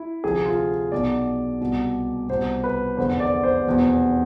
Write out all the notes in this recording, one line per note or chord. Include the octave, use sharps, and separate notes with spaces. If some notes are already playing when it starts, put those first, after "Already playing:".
Already playing: E4
D2 C3 F3 G#4
F4
B1 B2 D5
C2 B2
C2 B2 C5
B4
F1 E2 D3 C5
D5
C5
F1 E2 B2